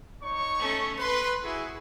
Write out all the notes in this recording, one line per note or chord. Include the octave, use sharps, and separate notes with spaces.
D#4 C#5 C#6
A3 C#4
B4 C6
E4 F#4 G#4